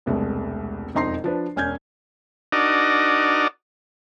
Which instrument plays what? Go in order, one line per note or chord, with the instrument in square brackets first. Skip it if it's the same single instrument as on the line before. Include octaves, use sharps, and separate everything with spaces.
[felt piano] E1 C2 G#3 A3 B3
E1 F2 D#4 A#5 C6 C7
F3 D4 B4
E1 C#4 G#5 F6 G6 G#6
[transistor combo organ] D4 D#4 F#4 A#4 D5 D#5